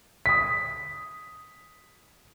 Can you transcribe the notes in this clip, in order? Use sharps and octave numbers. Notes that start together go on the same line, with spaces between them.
D#6 B6